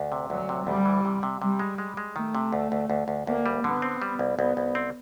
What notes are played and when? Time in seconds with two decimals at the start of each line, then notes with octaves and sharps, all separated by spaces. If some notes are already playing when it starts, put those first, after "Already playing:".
Already playing: D2
0.12 C3
0.30 D2 F#3
0.49 C3
0.67 D2 G3
0.85 E3
1.05 C3
1.23 C3
1.42 C3 G3
1.59 G#3
1.78 G#3
1.97 G#3
2.16 D#3 A3
2.35 C3
2.53 D2
2.72 D2
2.90 D2
3.08 D2
3.27 D2 A#3
3.46 G3
3.64 D3 B3
3.82 C4
4.02 G3
4.19 C2
4.38 C2 B3
4.57 C2
4.75 C4